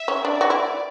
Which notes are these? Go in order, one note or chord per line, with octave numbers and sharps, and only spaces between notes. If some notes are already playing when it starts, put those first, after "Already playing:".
Already playing: E5
C#4
D4 D5
F#4
E4